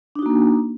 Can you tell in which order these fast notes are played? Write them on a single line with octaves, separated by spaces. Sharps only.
D4 D#4 F#4 A#3